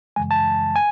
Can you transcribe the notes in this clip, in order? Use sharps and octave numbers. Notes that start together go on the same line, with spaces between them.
F#2 C#3 E3 G#3 G#5
A5
G#5